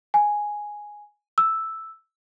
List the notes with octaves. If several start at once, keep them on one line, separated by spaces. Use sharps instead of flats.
G#5
E6